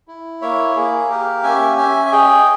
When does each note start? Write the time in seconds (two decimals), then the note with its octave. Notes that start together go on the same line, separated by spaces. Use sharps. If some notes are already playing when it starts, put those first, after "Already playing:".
0.08 E4
0.42 A#3 C#5 E5
0.76 A#3 G#4
1.10 G4 A#4
1.44 C#4 E5 G#5
1.78 C#4 E5 G#5
2.06 E5
2.12 G#4 D#5 G5